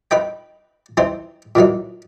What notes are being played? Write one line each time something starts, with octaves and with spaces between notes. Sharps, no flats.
D#4 B4 D#5 G5
E3 C4 D#4 C5
A#2 E3 F#3 D#4